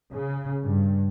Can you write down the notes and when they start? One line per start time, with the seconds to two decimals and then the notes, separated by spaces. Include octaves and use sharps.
0.12 C#3
0.64 G2